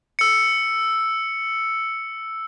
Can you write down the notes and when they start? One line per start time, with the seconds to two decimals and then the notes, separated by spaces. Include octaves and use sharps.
0.19 E6 C#7